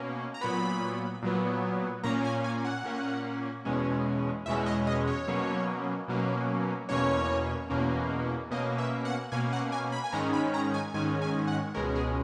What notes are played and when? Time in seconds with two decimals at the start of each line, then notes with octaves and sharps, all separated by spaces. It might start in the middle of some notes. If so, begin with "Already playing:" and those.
Already playing: B2 A#3 C#4
0.34 A#5
0.41 A#2 F#3 B3 B5
1.23 A#2 F#3 B3
2.03 A#2 A#3 C#4 A#5
2.24 G#5
2.44 G#5
2.64 F#5
2.84 A#2 A#3 C#4
3.65 E2 B2 G#3 C#4
4.46 E2 B2 G#3 C#4 E5
4.66 D#5
4.87 D#5
5.07 C#5
5.28 B2 F#3 A#3 C#4
6.08 B2 F#3 A#3 C#4
6.89 E2 B2 A#3 C#4 C#5
7.70 E2 B2 A#3 C#4
8.51 B2 A#3 C#4 D#5
8.78 E5
9.05 F#5
9.32 B2 A#3 C#4 G#5
9.53 F#5
9.72 G#5
9.92 B5
10.04 G#5
10.13 G#2 D#3 G#3 C#4 A#5
10.33 B5
10.54 A#5
10.74 G#5
10.94 G#2 D#3 G#3 C#4 G#5
11.22 G#5
11.47 F#5
11.74 C#2 B2 G#3 C#4 A#4
11.95 G#4